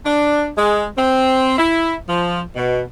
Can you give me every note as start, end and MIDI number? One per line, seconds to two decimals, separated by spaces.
0.04 0.49 62
0.56 0.86 56
0.97 1.56 60
1.58 1.94 64
2.08 2.40 53
2.56 2.81 47